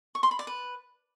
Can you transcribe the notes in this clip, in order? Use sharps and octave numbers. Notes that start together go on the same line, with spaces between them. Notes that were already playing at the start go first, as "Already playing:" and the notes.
C#6
C6
B5
D5
B4